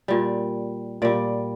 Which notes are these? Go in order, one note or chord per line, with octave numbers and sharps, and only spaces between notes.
A#2 G3
A#2 G3 D5